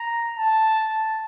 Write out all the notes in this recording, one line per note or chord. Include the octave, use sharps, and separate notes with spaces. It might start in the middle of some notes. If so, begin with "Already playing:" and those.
Already playing: A#5
A5